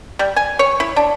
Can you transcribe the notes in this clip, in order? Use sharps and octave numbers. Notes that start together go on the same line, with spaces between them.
G3
G#5
C#5
E4
D4